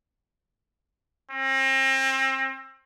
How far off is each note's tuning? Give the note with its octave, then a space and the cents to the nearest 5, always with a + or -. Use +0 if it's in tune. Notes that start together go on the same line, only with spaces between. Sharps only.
C4 +35